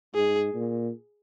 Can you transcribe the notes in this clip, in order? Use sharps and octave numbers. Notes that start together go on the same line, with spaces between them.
G#2 G#4
A#2